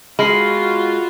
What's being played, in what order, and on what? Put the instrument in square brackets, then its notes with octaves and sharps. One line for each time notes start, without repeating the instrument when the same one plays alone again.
[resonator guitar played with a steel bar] G#3 [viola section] F4 F#4 [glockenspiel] B5 F6 C7